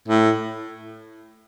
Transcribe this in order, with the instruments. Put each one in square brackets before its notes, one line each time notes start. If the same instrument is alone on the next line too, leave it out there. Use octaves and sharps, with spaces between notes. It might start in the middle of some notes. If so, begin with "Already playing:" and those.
[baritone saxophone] A2